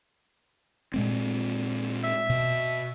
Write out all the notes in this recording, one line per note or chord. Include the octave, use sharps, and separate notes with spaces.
A#2 G#3 C4
E5
B2